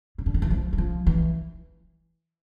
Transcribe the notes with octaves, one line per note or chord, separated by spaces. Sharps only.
C#3
D3
D#3
E3
F3
E3
F3
E3